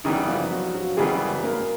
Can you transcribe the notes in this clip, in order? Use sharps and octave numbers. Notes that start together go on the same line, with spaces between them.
F#2 C#3 E3 G3 B3 D#4
F3 F4
F#3 F#4
F#3 F#4
F#2 C#3 E3 G3 G#3 B3 G#4
A#3 A#4